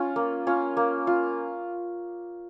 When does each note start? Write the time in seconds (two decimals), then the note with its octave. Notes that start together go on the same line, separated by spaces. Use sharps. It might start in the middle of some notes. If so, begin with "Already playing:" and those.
Already playing: C#4 F4
0.16 A#3
0.47 C#4 F4
0.77 A#3
1.07 F4